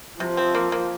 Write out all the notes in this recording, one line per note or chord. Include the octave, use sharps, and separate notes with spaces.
C3 F3
C4
A#3
A#3